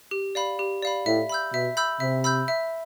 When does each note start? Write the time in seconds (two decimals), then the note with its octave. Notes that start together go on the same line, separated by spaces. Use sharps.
0.11 G4
0.35 D5 F5 B5
0.59 G4
0.83 D5 F5 B5
1.06 A2 E5
1.30 B5 E6 G6
1.53 B2 E5
1.77 B5 E6 G6
2.00 C3 E5
2.24 B5 E6 G6
2.48 E5